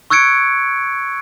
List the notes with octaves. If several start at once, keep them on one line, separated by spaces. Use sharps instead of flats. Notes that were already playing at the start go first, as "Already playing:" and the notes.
C#6 E6 F#6 G#6 C#7 D7